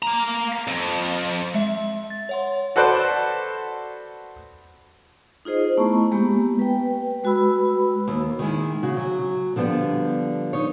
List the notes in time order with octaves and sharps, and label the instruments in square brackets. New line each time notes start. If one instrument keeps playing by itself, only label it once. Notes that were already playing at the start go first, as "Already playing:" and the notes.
[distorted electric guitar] A#3 A#5
F2
[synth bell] G#3 E5
A6
C#5 F#5 C6
[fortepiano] F#4 A4 B4 C5 D5
[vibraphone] D#4 F4 G#4 C5 D#5
A3 B3 E4 A5 A#5 C#6
G#3 A#3 B3 G4
B4 G5
G#3 F#4 B4 B5 E6
[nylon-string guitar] D#2
D#3 G#3 E4
C#3 F#4
F#3
D3 F3 G3 B3
D#4 C#5